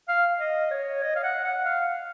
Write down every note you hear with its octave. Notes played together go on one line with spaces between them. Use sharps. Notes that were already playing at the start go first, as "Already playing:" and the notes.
F5
D#5
C#5
D#5
F5
F#5
F#5
F5